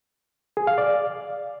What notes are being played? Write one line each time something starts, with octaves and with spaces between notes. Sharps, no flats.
G#4
F5
D5